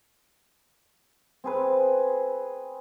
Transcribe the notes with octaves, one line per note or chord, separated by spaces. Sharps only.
C4 G#4 B4